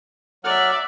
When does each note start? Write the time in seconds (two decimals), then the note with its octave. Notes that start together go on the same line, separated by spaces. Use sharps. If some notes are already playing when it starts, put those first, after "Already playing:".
0.44 F#3 D5 E5 F#5 F6